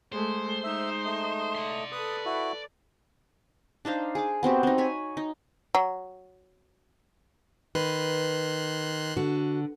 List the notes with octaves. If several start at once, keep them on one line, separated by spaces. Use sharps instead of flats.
G#3 A3 C5
G#3 D#4 E5
A3 D#5
D5 C6
A4 B4 D#6
E4 F#4
D4 D#4 C5 F5
G#4 D6
B3 C4 F#4 G4
C4 D#4
C#5 G#5 B5
D#4
F#3
D#3 B4 C6 F#6
D3 F#4